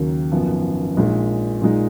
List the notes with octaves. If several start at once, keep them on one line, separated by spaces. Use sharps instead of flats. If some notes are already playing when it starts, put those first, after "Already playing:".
Already playing: D#2 C#3 F#3 A#3
G#1 F#2 F3 B3
A#1 A#2 G#3 D#4
A#2 G#3 D#4